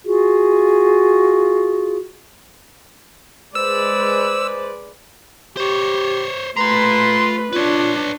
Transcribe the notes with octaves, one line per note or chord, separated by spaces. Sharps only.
F4 F#4 G#4
G#3 B4 C5 D5 E6
G4 C5 C#5
A3 F4 B4 A#5 C6
D4 F4 B4 C#5